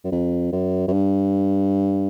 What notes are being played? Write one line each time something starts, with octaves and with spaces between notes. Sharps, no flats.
F#2
F2
F#2
F#2
G2